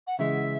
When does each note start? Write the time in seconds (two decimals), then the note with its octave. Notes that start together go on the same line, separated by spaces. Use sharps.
0.07 F#5
0.19 C#3 E3 G#3 E5